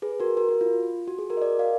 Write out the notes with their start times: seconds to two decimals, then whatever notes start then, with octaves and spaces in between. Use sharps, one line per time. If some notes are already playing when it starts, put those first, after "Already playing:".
0.02 G#4 B4
0.20 F#4 A#4
0.37 F#4 A#4
0.49 F#4
0.61 F4
1.08 F#4
1.19 G#4
1.30 F#4 A#4
1.37 D#5
1.41 A#4 D5
1.59 D5 F5